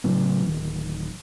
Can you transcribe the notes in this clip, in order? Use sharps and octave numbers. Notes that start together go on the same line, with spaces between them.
A2 C#3 F#3 B3
D1 D#3